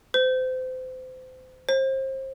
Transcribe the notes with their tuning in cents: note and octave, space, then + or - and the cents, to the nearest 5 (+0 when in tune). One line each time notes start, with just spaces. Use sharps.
C5 -30
C5 +30